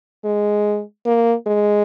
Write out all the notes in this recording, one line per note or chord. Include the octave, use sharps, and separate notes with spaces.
G#3
A#3
G#3